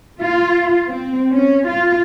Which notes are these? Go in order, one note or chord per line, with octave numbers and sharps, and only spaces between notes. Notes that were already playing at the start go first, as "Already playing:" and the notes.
F4
C4
C#4
F4